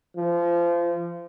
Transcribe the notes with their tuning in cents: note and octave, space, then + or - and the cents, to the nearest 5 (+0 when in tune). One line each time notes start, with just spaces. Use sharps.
F3 -25